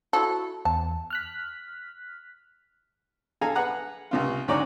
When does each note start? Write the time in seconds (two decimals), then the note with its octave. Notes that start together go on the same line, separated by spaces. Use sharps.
0.13 E4 F#4 A4
0.65 E2 A5
1.10 F6 F#6 B6
3.41 G#4 A4 F5 G#5 A#5
3.55 G#4 B4 F#5 A#5
4.11 C#2 C3 F4
4.48 D2 G#2 C#4 C#5 D5 A#5